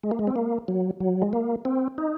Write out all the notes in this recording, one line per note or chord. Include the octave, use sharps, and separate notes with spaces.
G#3
A#3
G#3
C4
A#3
F#3
F#3
G#3
A#3
C4
D#4